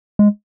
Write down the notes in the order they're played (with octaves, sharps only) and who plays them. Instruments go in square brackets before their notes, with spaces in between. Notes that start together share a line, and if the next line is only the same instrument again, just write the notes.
[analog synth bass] G#3